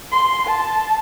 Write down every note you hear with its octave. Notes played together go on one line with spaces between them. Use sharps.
C6
A5